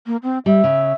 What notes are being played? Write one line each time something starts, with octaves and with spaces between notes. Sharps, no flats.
A#3
C4
G3 E5
C#3